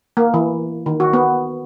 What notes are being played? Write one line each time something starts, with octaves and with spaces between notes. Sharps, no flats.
A#3
E3
D#3
F#4
B3